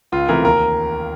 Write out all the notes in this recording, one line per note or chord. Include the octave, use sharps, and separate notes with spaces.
C#2 F4
C3 E3 A3 A#4
D#2 A#4